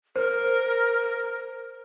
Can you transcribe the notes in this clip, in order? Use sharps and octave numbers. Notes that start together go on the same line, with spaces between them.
A#4 C5